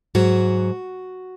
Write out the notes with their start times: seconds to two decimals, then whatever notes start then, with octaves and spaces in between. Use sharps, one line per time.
0.15 G#2 F#3 F#4